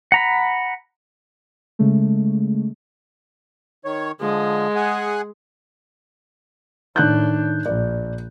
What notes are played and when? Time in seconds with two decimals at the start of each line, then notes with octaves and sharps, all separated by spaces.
0.12 F#5 A#5 B5
1.79 C#3 G#3 A3
3.85 D#3 C#5
4.21 D3 F3 G#3
4.75 G#4 F#5 G#5
6.96 A2 D#3 D4 F#6 G6
7.66 A#1 D5